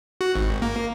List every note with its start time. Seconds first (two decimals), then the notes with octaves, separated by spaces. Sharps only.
0.21 F#4
0.35 G#1
0.62 A#3